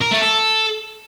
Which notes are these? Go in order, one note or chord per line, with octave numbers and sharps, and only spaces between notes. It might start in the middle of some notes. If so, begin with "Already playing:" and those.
A#4
A3
A4